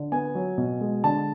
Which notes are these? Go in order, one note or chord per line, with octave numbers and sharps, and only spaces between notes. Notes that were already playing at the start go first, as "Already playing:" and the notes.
Already playing: D3
B3 G#5
F#3
B2
G#3
D3 A5